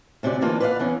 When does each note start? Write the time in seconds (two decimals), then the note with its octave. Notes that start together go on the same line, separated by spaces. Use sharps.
0.23 D2 C3 C#4 F#4 D5
0.41 D2 D#3 E3 A#3 D4 F4
0.60 B4 C5 D5 D#5 F5 F#5
0.80 E2 E3 C#4